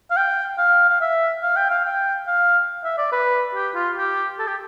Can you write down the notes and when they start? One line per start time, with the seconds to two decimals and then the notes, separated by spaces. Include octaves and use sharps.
0.11 F5
0.17 G5
0.58 F5
0.90 F5
1.01 E5
1.43 F5
1.56 G5
1.71 F5
1.85 G5
2.27 F5
2.84 E5
2.98 D5
3.12 B4
3.55 G4
3.75 F4
3.97 G4
4.39 A4
4.47 G4